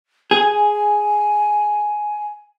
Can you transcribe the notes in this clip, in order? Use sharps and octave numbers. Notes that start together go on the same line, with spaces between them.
G#4 G#5